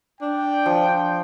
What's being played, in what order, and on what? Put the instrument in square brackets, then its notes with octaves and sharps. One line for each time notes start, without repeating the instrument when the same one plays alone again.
[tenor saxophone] D4 [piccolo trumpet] G5
[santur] F3